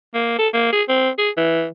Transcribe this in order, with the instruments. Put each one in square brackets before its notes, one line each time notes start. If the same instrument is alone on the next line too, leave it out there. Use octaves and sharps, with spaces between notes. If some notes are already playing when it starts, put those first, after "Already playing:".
[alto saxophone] A#3
A4
A#3
G#4
C4
G#4
E3